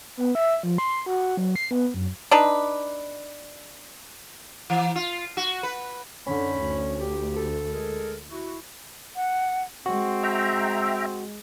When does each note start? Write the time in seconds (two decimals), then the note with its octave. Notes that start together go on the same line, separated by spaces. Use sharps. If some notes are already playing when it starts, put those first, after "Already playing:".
0.17 B3
0.35 E5
0.63 F3
0.78 C6
1.06 F#4
1.37 F#3
1.56 C7
1.71 B3
1.94 F#2
2.31 D4 D#4 B4
4.70 E3
4.96 F4
5.37 F#4
5.63 B4
6.27 F#2 D3 C#4 D#4 B5
6.61 D2
7.00 G4
7.36 A4
7.72 G#3 G#4 A#4
8.31 E4 F#4
9.16 F#5
9.86 G#3 C4 F#4
10.23 E5 G5 A#5